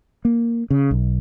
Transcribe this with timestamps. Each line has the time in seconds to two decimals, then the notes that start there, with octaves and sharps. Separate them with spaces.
0.25 A#3
0.70 C#3
0.91 B1